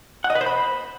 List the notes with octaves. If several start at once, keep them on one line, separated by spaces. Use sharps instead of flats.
F#5
D#5
B4
C5
B5